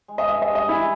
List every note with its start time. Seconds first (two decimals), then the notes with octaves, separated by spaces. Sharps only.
0.08 G#3
0.18 D#5
0.28 G2 E5
0.42 D#5
0.49 G2
0.55 D#5
0.69 E3 E4